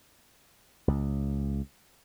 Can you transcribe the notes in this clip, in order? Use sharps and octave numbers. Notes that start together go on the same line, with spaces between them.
C#2